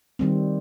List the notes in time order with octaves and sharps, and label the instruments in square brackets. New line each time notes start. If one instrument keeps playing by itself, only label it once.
[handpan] D#3 G3 C4